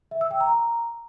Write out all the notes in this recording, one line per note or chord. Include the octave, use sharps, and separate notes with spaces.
E5
E6
G5
A#5